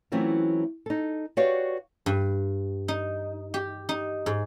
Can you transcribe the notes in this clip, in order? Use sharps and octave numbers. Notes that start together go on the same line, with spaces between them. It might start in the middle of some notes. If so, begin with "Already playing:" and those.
E3 F#3 A3 C4 C#4 F4
D#4 A4
F#4 G4 B4 C#5 D5 F5
G2
D#4
G4
D#4
G#2